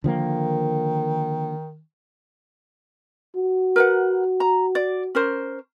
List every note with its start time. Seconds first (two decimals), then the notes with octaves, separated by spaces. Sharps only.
0.04 D3 D#3 F3 A#3
3.36 F#4
3.76 A#4 B4 F#5
4.40 A#5
4.75 D5
5.15 C#4 A#4 C5